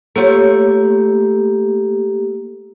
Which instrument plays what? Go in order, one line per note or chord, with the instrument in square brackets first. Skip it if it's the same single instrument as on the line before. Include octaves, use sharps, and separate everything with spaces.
[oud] A3 F4 C#5 [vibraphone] A#3 G4